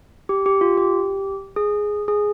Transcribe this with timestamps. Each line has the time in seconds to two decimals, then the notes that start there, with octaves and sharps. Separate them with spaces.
0.29 G4
0.46 G4
0.61 F4
0.78 G4
1.56 G#4
2.08 G#4